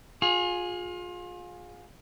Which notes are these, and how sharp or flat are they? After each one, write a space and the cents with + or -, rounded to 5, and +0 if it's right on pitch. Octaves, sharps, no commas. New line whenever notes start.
F4 +30 G#4 +0